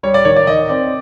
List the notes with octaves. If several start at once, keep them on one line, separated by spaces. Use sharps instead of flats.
G3 C#5
D5
D#3 C#5
D5
D#3 D#5
C4 D5